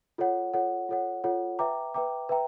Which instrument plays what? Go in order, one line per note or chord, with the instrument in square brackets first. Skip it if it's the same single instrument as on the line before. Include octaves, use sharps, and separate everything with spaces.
[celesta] F4 A4 C#5 F#5
F4 A4 C#5 F#5
F4 A4 C#5 F#5
F4 A4 C#5 F#5
B4 E5 G5 A#5 D6
B4 E5 G5 A#5 D6
B4 E5 G5 A#5